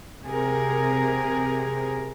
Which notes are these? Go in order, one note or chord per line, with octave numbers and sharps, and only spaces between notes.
C3 G#4 A#4